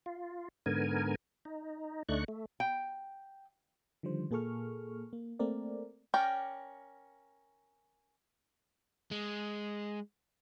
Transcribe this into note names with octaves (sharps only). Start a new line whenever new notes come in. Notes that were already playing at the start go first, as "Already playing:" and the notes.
F4
G#2 D3 B3 A#4 G#5
D#4
D2 A3 D4 D#4 C#6 F#6
A3
G5
D3 D#3 F3 G3 C5
A#2 A#3 G#4 A4 C#6 F6
A#3
A3 A#3 C4 A#4 D5
C#4 A#4 D5 G5
G#3